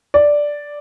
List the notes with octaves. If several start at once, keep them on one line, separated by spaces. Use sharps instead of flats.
D5